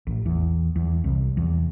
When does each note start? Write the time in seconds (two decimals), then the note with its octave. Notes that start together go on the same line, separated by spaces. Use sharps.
0.07 A1
0.26 E2
0.76 E2
1.04 C2
1.37 E2